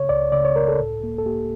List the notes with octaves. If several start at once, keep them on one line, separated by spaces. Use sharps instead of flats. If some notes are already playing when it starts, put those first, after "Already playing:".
Already playing: C#3 C#5
C#2 D5
C#3 D5
C#5
C#2 A#4
A4
A2
A#3
A4
A#3 G4